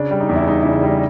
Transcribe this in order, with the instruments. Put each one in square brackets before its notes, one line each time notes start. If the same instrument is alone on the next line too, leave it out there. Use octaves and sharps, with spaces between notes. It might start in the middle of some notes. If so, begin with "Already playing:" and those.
Already playing: [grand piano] C#3 D4
G3
D#4
E2
E4
G3 D#4
E4
C#3
G3
E4